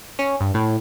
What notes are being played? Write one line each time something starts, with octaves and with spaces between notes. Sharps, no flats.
C#4
G2
A2